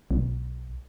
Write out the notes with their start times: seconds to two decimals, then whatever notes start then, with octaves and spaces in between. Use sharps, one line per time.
0.11 B1